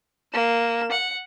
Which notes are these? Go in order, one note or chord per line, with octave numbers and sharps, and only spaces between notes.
A#3 E7
F#5